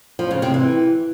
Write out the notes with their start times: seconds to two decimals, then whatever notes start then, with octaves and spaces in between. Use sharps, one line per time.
0.19 F3
0.31 C#3
0.42 C3
0.54 E3